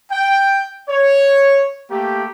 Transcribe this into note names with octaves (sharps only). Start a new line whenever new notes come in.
G5
C#5
A3 A#3 G4